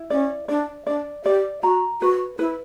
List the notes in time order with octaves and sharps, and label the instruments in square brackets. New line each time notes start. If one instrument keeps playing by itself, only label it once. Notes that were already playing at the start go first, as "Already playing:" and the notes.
Already playing: [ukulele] E4
[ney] C#4 [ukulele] D5
[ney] D4 [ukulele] D5
[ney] D4 [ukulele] D5
[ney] G4 [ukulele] D5
[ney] F#4 [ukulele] A#5
[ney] F#4 [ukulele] B4
[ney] E4 [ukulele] B4